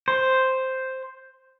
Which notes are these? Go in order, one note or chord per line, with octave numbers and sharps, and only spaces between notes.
C5